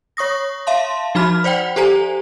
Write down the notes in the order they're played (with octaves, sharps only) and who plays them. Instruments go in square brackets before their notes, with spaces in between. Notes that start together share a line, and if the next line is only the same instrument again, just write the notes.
[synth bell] C#5 C#6 D#6 A#6
E5 F5 A5 C6
F3 D#4 F#4 B5 F6
C5 D5 F#5 G5
G4 A4 C5 G#5 A#5